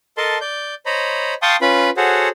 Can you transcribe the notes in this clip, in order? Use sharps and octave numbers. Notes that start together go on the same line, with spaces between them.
A4 A#4 D#5 A5 C6
D5 G6
C5 C#5 D#5 A#5 B5
F5 G5 A5 C6 C#6 D#6
C#4 F4 B4 B5
F#4 G#4 A4 C5 C#5 F#5